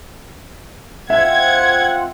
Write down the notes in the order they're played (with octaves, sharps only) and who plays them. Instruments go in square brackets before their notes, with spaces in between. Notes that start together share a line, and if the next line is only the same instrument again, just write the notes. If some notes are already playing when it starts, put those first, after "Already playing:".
[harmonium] C4 F4 [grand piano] E5 [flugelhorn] F#5 [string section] G#6